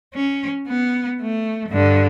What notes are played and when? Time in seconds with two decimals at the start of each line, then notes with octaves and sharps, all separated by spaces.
0.14 C#4
0.68 B3
1.21 A3
1.69 G2 D3